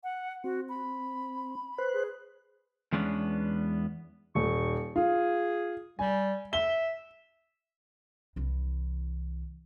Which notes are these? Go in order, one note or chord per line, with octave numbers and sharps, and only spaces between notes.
F#5
C4 F#4
B5
B4 C5 F#6
G#4
E2 G#3 B3 C#4 D4
D#1 C#6
F4 G#4
G3 G#5
E5 G7
C2 E3